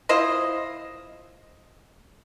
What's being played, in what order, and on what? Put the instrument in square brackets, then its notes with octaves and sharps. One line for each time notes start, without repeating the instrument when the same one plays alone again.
[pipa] E4 F4 C5 D#5